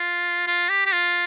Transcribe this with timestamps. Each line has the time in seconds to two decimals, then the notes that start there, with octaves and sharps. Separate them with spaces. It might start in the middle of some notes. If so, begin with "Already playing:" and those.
Already playing: F4
0.47 F4
0.69 G4
0.86 G4
0.92 F4